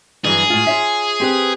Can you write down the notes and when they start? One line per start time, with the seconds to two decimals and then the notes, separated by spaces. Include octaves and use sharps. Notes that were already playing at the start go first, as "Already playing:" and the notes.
0.24 G2 E3 F#3 G#4
0.50 A2 F4
0.67 F4 C#5 E5
1.20 C4 G4 B4